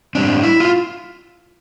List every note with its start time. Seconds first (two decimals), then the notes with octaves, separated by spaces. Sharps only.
0.15 A2 G3 C4 D4
0.43 E4
0.60 F4